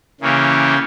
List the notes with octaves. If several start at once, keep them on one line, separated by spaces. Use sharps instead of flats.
C#3 E3 A#3 C#4 G4